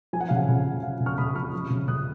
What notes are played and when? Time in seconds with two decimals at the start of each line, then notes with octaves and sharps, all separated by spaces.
0.13 F3 G#5
0.21 F#5
0.29 C#3 F5
0.36 F#5
0.49 C#3
0.66 F3
0.83 F3 F5
1.00 C#3
1.06 C#6 F6
1.18 C#3 B5 D#6
1.35 F3 C#6 F6
1.53 F3
1.70 C#3
1.88 C#3 D#6 F#6